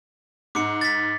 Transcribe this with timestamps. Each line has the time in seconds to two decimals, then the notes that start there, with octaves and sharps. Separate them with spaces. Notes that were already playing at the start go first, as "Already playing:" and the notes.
0.55 G#2 D6 C#7
0.81 A6 B6